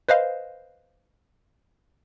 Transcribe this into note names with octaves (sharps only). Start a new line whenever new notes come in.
B4 C5 D#5 F5